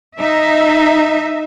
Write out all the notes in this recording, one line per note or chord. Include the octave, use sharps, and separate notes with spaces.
D#4 E5